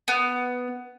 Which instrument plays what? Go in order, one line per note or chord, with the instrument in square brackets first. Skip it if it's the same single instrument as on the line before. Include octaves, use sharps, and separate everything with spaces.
[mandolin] B3